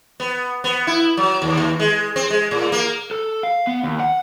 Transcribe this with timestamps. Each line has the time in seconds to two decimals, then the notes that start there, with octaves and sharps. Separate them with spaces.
0.20 B3
0.64 B3
0.87 E4
1.17 F#3
1.42 D#2
1.57 D#2
1.80 G#3
2.16 C4
2.30 G#3
2.51 A2
2.72 A#3
3.11 A4
3.43 F5
3.67 B3
3.84 D#2
4.00 F#5